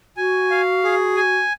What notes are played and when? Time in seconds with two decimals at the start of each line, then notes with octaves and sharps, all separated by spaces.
0.17 F#4 G#5
0.51 F5
0.84 G#4
1.16 G#5